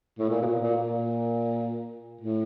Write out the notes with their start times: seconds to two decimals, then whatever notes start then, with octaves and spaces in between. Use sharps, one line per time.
0.19 A2
0.29 A#2
0.42 B2
0.46 A#2
0.62 A#2
0.77 A#2
2.21 A2